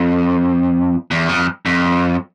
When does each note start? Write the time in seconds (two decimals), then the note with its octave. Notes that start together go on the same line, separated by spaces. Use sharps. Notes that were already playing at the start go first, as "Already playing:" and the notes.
Already playing: F2
1.11 E2
1.29 F2
1.66 F2